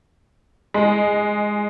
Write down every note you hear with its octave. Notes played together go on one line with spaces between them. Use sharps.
G#3